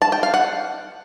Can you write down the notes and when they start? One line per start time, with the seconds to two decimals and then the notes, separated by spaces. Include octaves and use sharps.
0.02 A5
0.12 G5
0.23 F5
0.34 F#5